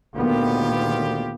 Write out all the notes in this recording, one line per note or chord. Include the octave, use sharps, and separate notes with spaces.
D2 A#2 D#3 B3 F4 G4